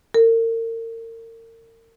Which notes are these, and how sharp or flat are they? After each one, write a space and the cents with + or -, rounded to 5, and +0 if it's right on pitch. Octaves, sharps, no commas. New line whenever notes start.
A#4 -40